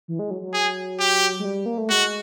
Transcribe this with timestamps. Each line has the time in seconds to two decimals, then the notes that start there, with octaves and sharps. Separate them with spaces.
0.08 E3
0.19 G#3
0.30 F#3
0.42 F#3
0.53 G#4
1.00 G4
1.39 G#3
1.45 G3
1.66 A#3
1.78 A3
1.90 G#3 F#4